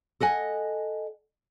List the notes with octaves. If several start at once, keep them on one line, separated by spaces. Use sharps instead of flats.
A4 D#5 F#5 G#5